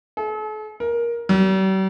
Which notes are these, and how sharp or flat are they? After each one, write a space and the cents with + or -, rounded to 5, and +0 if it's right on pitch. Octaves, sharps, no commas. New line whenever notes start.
A4 -45
A#4 +15
G3 -45